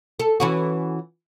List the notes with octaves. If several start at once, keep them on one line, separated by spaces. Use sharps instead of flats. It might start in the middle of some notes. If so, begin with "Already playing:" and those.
A4
E3 C#4 F#4